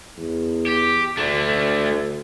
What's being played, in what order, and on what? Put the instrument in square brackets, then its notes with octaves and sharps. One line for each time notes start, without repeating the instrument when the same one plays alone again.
[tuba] E2
[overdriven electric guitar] G4
[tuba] D2 [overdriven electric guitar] D3 A3